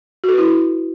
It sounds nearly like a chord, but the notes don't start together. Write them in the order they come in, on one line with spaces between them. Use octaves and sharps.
F#4 A4 B4 E4